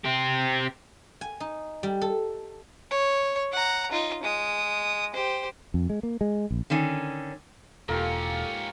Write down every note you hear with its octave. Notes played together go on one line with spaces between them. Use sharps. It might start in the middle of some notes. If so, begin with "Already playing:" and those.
C4 G4
G#5
D#4
G3
A4
C#5
F#5 A#5
D#4 F4
G#3 D#6
G4 C5
F2
G#3
A#3
G#3
A#1
D3 D#3 C#4
E1 G#2 A#3 C#4 F4 G4 A4